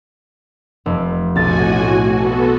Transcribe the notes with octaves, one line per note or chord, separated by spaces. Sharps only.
F1
B1 A2 F#4 G#5 A6
B3 F#4 A4